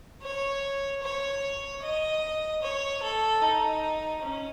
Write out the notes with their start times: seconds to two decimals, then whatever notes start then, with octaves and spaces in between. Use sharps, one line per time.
0.22 C#5
1.03 C#5
1.82 D#5
2.62 C#5
3.02 A4
3.42 D#4
4.22 C#4